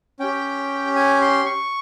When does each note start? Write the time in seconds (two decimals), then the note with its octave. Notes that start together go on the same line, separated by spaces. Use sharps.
0.20 C#4 G4 G5
0.95 G#5
1.21 C6
1.46 C#6